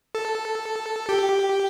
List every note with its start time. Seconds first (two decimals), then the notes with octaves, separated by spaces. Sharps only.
0.15 A4
1.09 G4